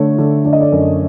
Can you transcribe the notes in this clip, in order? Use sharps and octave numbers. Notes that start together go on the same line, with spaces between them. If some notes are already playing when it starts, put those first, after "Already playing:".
Already playing: D3 A3 C#5
D3
D3 D5
D#5
D5
F#2